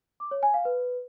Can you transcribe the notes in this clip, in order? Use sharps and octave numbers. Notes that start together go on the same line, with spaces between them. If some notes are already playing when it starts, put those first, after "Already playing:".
D6
C#5
G#5
F5
B4